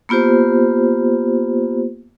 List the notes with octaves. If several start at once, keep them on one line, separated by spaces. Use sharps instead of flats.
A#3 B3 F4 G4 C5